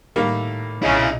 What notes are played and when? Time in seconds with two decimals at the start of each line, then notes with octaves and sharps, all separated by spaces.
0.16 A2 D#3 G3 A#3
0.82 B1 A#2 C#3 E4 D#5